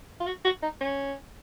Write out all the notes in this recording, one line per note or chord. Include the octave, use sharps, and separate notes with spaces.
F4
F#4
F#4
D#4
C#4